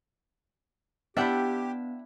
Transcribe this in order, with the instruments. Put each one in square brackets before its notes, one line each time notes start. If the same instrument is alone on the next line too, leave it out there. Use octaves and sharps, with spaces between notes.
[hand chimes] B3 [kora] D4 E4 [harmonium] G4 [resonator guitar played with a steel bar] E5 F#5 G5